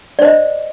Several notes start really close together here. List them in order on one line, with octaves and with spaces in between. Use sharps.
D5 C5 D#5